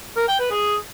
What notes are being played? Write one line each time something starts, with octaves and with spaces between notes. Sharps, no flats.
A#4
G5
B4
G#4